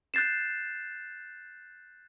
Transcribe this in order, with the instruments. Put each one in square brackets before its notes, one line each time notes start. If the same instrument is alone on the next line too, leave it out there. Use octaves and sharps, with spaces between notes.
[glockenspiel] F#6 G6 A6 C7 E7